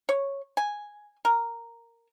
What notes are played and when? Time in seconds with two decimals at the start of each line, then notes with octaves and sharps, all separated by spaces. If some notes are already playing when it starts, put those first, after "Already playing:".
0.09 C#5
0.57 G#5
1.25 A#4